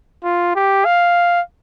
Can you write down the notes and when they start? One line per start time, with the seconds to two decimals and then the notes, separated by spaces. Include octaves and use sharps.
0.24 F4
0.55 G4
0.85 F5